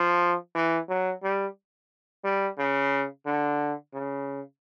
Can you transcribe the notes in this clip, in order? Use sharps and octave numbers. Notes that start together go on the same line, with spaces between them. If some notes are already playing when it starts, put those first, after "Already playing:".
Already playing: F3
E3
F#3
G3
G3
C#3
D3
C#3